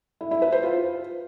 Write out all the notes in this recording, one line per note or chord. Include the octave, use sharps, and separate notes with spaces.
E4
E4
B4
C5
F4